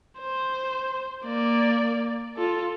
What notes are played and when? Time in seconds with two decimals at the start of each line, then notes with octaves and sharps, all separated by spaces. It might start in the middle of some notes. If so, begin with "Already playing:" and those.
0.21 C5
1.25 A#3 D5
2.37 F4 A4